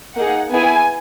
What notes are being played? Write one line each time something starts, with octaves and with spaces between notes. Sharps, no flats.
A#3 D#4 G#4 F#5
B3 E4 G#4 G#5